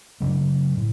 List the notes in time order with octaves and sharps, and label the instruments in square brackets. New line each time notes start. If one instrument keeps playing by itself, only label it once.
[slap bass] C#3 F#3 A3
A2